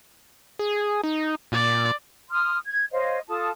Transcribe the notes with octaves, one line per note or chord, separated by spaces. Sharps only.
G#4
D#4
A#2 D5
C6 D#6 F6
G#6
C5 C#5 D#5 F5
F4 A4 A5 D#6